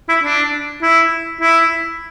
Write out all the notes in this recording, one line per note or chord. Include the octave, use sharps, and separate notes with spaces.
E4
D4
E4
E4